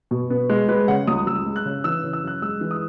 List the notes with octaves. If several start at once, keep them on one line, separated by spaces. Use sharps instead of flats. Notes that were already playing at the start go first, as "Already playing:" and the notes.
B2
B3
G#3
G#3 B4
C#3 F#5
C#2 D#6
C#2 E6
G#3
F#6
C#3
E3 E6
C#3
E6
F#2 F#6
G#3 E6
E3
D#6